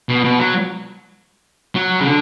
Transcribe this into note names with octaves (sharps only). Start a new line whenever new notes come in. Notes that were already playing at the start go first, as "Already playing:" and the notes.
B2
B2
F#3
F#3
C#3
D3